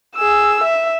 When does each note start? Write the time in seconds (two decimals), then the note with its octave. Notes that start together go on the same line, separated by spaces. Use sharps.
0.15 G#4 E6
0.63 E5